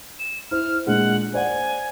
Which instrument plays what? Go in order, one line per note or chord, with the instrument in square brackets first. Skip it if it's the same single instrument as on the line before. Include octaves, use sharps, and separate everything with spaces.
[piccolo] E7
[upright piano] E4 C5 [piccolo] F6
[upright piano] A#2 G#3 D4 [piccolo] F#5
[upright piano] C5 D5 F#5 [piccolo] G#5